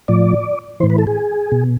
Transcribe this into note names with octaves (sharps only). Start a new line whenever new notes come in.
A2 F3 D5
A2 E3 C5
B4
A4
G#4
B2